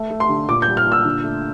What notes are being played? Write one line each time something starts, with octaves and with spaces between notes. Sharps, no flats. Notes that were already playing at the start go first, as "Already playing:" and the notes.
Already playing: A3
A3
C6
D3
A#2 D6
G6
G3
F6
A#2
E6
D3
A3